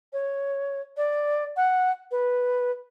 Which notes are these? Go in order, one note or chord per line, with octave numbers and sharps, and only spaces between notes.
C#5
D5
F#5
B4